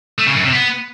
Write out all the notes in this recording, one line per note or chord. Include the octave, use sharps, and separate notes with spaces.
A3
C#3
F#2
C3
B3